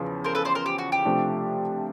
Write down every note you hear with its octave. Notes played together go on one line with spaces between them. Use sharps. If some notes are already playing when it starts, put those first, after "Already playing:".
Already playing: E2 C#3 F3 B4
A#4 C5
A4 B4
C5 D5
A#4 C5
G4
F#4
G4
C3 F3 A3 D4